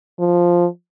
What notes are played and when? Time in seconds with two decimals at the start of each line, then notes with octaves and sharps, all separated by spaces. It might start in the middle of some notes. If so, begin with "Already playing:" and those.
0.20 F3